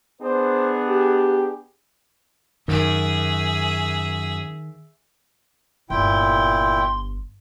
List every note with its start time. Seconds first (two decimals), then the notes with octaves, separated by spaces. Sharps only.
0.21 B3 D4 G#4 C5
0.87 G4
2.68 F#2 D#3 G#4 E5
5.90 G1 A#2 E4 G5 C6